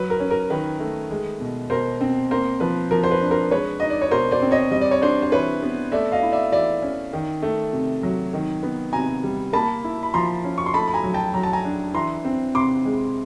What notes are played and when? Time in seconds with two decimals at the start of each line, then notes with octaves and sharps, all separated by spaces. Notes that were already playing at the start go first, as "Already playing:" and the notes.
Already playing: F#3 B4
0.10 A#4
0.20 C#4
0.30 A#4
0.50 D#3 B4
0.80 A3
1.11 G#3
1.40 B2
1.70 B2 A#4 C5
2.01 C4
2.31 A#3 A#4 C5
2.60 F3 B4
2.91 F3 A#4
3.04 C5
3.11 B4
3.21 D4
3.31 A#4 C5
3.51 G#3 B4 C#5
3.80 D#4 D#5
3.90 D5
4.01 C#5
4.11 B2 A#4 C5
4.31 C5 D5
4.42 C4
4.51 C#5 D#5
4.71 G3 D#5
4.81 D5
4.91 C#5
5.01 D4 C5 D5
5.22 C5
5.32 E3 B4 C#5
5.63 B3
5.92 A3 D5 E5
6.12 D#5 F5
6.23 E4
6.32 D5 E5
6.52 E3 D5 E5
6.82 C#4
7.13 D#3
7.42 A3
7.73 C3
8.03 F#3
8.33 D#3
8.63 B3
8.93 C3 G#5 A#5
9.23 G3
9.53 A#3 A5 B5
9.84 E4
10.03 B5
10.14 F3 A#5 C6
10.44 C#4
10.58 C#6
10.66 C6
10.74 A3 A5 B5
10.87 B5
10.94 G#5 A#5
11.04 F#3
11.14 G5 A5
11.34 F#3 A#5
11.43 A5
11.53 G#5 A#5
11.64 D4
11.94 E3 A#5 C6
12.25 C4
12.54 C3 C6 D6
12.85 G#3